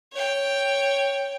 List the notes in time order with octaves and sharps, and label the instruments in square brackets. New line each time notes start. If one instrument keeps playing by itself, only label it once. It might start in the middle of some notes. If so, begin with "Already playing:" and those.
[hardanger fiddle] C#5 G5